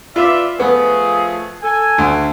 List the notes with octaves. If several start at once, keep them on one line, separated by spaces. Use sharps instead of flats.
F4 B4 D5 E5
F3 A3 B3 G#4
A4 G#5
D2